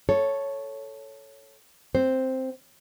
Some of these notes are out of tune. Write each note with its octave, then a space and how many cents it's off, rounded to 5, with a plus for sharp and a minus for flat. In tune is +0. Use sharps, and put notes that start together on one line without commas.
A4 +0 C#5 +0
C4 +0 C5 +0